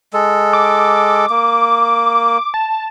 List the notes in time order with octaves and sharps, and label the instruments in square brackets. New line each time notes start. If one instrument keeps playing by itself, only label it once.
[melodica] G#3 A4
[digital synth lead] D6
[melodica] A#3
[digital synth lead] A5